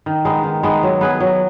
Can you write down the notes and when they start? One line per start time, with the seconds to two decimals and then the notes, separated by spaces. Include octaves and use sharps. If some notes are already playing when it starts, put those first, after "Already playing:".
0.06 D#3
0.25 G#3 B3 D#4
0.44 D#3
0.63 G#3 B3 D#4
0.83 F#3
1.01 B3 G#4 B4
1.20 F#3